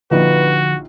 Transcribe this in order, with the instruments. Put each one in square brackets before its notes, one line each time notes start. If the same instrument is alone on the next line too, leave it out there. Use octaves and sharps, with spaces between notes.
[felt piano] A#1 D#4 F4 [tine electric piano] D3 F3 [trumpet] F#4 [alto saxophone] B4